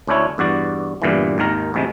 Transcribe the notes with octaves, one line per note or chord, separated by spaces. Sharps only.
D2 C#4 D4 E4 C#5
E2 G2 F#4 D5
E2 G2 A#2 D3 E3
G#1 D#2 D#3 A#4
A1 D2 C3 G#3